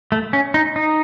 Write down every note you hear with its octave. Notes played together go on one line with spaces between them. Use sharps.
A3
C#4
D#4
D#4